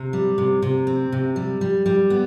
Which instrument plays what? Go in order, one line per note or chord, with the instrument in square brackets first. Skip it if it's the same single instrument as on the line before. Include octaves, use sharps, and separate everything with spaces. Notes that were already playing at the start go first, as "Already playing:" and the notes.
Already playing: [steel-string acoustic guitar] C3
G3
C3
C3
C4
C3
G3
G3
G3
B3